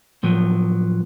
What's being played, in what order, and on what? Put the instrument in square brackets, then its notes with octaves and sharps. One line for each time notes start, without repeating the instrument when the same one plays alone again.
[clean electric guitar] A2 F3 F#3